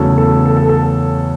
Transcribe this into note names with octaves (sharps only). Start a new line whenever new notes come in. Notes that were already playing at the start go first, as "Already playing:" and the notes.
Already playing: E2 C#3 F#3 A3 C#4 A4
A4
A4
A4
A4